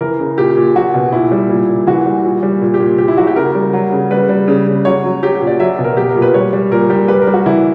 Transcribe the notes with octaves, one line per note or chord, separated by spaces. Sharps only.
E3 A#4
C#3
A#2 G4
A#2
F#3 F#4
B2
A#2 E4
G3
A#2
A#2
E3 F#4
G3
A#2
G3
A#2
G4
A#2
A#2 G4
E4
F#3 F#4
G4
C#3 A#4
G3
F#3
C#3
G3 B4
G3
C#3
C#3
F#3 C#5
F#3
F#3 G4
G4
A#2
D5
F#3 E5
B2
A#4
F#3 G4
A#4
A#2
B4
G3 C#5
G3
A#2 A#4
G3 G4
G3 B4
A#4
G3
F#4
E3 E4